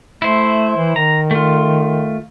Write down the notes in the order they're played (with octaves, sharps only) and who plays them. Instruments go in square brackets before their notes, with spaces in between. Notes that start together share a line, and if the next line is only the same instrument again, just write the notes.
[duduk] A3 [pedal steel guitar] E4 C5
[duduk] E3
[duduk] D#3 [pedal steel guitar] A#5
[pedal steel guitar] A3 F4